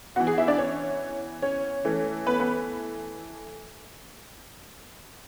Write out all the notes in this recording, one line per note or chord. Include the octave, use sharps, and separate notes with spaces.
E3 B3 F#4 F#5
G#4 G#5
E4 E5
D4 D5
C#4 C#5
C#4 C#5
E3 A3 C#4
B3 B4
B3 B4